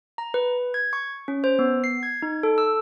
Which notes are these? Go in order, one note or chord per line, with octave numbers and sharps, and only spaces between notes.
A#5
B4
G#6
C#6
C#4
C5
B3
C7
G#6
D#4
A4
E6